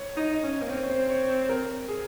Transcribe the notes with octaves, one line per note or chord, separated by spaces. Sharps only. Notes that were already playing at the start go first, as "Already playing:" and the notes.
Already playing: C#5
D#4 D#5
D#5
C#4 C#5
A#3
C4 C#5
C#5
C5
C#5
C#5
A#4
G#4